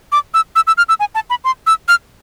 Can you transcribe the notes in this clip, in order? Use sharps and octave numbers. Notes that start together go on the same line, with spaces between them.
D6
E6
E6
E6
F6
E6
G#5
A5
B5
C6
E6
F6